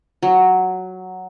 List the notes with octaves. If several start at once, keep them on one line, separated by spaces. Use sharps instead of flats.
F#3